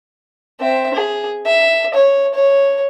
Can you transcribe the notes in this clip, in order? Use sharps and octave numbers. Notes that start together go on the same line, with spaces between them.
C4 E5
G#4
E5
C#5
C#5